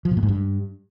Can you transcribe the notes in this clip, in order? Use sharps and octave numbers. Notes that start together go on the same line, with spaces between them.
F3
B2
A2
G#2
G2